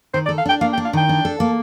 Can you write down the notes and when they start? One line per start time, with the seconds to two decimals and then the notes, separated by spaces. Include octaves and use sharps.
0.13 D#3 C5
0.26 D5
0.29 A4
0.38 F5
0.46 D4 G5
0.61 A#3 F5
0.73 G5
0.78 D4
0.85 F5
0.93 D#3 G5
1.09 D4
1.25 A4
1.40 A#3